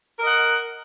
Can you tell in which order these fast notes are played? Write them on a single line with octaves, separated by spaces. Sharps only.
A#4 D#5 F#5